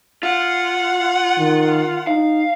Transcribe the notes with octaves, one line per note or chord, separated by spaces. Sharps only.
F4 F#5
D#3
D#4 F5